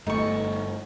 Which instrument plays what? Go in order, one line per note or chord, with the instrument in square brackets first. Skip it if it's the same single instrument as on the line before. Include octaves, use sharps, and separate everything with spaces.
[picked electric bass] G1 A3 [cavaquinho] D#4 C#6